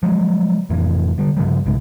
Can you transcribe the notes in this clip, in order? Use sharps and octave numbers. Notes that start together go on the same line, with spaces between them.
F3 F#3 G#3
F1 F2 A2 E3
D3 G3
G2 C#3 F3 G3
B1 G#2 C#3 G#3